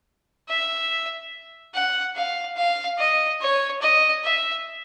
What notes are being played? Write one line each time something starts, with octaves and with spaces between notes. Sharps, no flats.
E5
F#5
F5
F5
D#5
C#5
D#5
E5